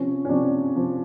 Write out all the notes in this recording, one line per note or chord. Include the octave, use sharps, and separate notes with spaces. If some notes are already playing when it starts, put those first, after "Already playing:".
Already playing: C3 F3 C#4
C#4
C3 F3 D4
C3 F3